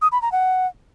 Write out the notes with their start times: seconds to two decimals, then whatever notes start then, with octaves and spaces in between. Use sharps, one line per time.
0.02 D#6
0.12 B5
0.22 A#5
0.32 F#5